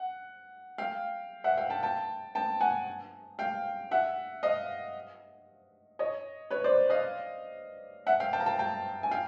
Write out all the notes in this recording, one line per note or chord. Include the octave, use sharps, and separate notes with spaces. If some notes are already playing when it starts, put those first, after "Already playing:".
Already playing: F#5
F5 G5
E5 F#5
F5 G5
G5 A5
G5 A5
G5 A5
F#5 G#5
F5 G5
E5 F#5
D#5 F5
C#5 D#5
B4 C#5
C5 D5
D#5 F5
E5 F#5
F5 G5
G5 A5
A#5
G5 A5
G5 A5
G#5
F5 G5